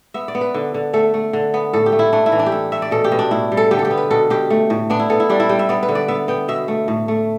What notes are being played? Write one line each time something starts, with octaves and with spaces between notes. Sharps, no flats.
B3 E5
D5
B3
B4
D3
D3
A3 A4
A3
D3
B3
A2 A4
G4
A3
E4
A3 D4
E4
E3
D4
G4
A3 E4
A3 E5
D5
B2 A4
G4
B2
D4
A2 E4
G3
A4
D3 G4
A4
G4
B3
B4
B2 A4
B2 G4
A3
A2
B3 D4
E4
B3 A4
E4
G3 D4
E4
G3 G5
E5
B3 D5
B4
D3
D5
B3 E5
B3 G5
B2 E5
A3
A2
A3